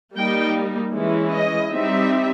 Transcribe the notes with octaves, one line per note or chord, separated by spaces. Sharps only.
G3 A#3 D#4 G5
E3 G#3 C#4 E4
D#5
G3 C4 D#4 E5